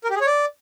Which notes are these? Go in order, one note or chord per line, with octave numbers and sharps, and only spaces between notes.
A#4
G4
G#4
C#5
D5